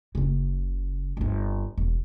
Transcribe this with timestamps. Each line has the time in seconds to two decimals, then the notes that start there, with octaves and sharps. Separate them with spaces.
0.15 F#1 C#3
1.17 G1 C4
1.77 E1